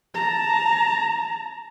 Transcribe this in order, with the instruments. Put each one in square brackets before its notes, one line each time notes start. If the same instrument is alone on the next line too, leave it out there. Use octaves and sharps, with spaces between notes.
[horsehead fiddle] A5 A#5